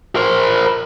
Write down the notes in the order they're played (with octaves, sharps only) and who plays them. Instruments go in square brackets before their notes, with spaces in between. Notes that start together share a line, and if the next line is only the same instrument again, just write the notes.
[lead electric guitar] A#4 C5